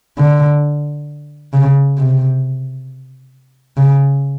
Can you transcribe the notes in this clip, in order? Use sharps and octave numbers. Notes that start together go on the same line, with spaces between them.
D3
C#3
C3
C#3